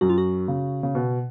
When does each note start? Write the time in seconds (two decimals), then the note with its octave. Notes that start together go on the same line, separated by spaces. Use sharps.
0.01 F#2 F#4
0.10 F4
0.18 F#4
0.48 C#3
0.83 C#3
0.95 B2